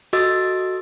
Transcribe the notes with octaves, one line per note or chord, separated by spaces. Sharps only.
F#4 A4 D#5 D6 E6 A6